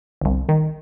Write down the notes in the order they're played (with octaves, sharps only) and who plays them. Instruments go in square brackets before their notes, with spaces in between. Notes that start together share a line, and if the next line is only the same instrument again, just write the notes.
[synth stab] G1 C2
D#3